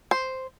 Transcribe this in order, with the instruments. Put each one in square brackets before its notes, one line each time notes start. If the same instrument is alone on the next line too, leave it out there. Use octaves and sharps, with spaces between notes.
[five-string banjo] C5